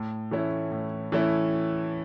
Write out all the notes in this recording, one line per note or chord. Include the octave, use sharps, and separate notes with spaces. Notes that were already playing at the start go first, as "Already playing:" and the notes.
Already playing: A2
E3 A3 C#4 E4
A2
E3 A3 C#4 E4